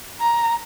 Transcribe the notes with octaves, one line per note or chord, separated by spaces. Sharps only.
A#5